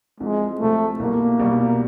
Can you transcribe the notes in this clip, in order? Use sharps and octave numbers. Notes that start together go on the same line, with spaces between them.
C2 C3 F3 G#3
C2 C3 F3 A3
C2 B2 G3 A#3
C2 B2 G3